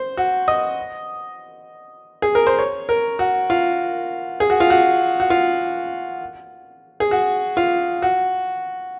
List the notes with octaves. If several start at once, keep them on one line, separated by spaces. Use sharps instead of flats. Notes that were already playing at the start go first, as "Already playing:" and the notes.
Already playing: C5
F#4
D#5
G#4
A#4
C5
C#5
A#4
F#4
F4
G#4
F#4
F4
F#4
F#4
F4
G#4
F#4
F4
F#4